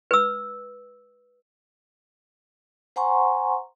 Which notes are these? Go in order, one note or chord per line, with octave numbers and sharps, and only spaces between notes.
B4 E6
C5 F#5 G#5 A#5 C6 C#6